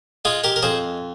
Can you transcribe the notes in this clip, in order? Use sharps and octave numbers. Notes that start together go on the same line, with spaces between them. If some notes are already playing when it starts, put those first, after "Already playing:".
G#3 F4 G#4
G4 A#4
A#4
F2 G#4 C5